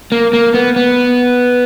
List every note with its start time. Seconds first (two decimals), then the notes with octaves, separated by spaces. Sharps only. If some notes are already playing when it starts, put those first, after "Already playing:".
0.12 A#3
0.33 A#3
0.54 B3
0.76 B3